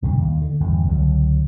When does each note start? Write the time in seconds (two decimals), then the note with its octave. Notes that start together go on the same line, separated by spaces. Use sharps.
0.02 C2 G2 B2 D3
0.18 D#2
0.42 D3
0.60 G1 E2
0.87 C#2 D3 E3 F#3